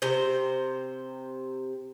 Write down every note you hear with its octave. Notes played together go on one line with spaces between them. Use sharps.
C3 C5